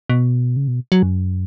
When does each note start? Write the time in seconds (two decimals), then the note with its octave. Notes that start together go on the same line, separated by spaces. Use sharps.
0.10 B2
0.56 C#3
0.68 B2
0.92 F#3
1.03 F#2